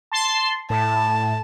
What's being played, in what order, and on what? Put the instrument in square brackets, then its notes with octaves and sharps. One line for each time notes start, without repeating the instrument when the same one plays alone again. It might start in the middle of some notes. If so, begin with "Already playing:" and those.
[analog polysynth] A5 C6
[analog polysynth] A2 [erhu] A5